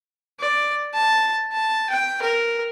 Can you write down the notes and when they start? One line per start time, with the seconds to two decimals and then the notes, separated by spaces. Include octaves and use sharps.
0.40 D5
0.94 A5
1.52 A5
1.90 G5
2.22 A#4